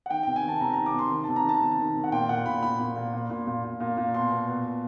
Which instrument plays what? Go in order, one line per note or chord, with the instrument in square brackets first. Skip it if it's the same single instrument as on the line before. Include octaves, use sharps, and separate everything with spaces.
[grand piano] F#5
D#3 G5
C3 G5
G#5
D#3 A5
C3 A#5
D#3 A#5
D6
C3 C6
D#3
C3 A5
A#5
D#3 A5
C3
D#3
C3
F#5
A#2 G5
A#2 F#5
A#2 B5
A#2 B5
A#2
A#2
A#2
A#2
A#2
A#2
A#2
A#2
B2 C6
B2
B2
B2